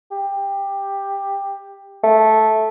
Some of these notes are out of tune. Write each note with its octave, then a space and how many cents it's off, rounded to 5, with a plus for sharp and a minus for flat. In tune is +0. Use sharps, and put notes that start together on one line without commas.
G4 +15
A3 -10